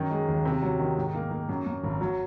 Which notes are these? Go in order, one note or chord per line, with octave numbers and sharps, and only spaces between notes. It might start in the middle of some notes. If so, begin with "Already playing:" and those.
Already playing: F#2 D#3
G#3
D#2
C3
F#3
D#3
G#2
A#3
A#3
F#2
F#2
G#1
F#3